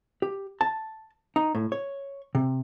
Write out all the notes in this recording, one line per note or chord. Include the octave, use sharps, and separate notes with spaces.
G4
A5
D#4
A2
C#5
C3